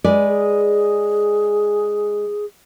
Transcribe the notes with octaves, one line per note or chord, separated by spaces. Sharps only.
G#3 B4 D5
G#4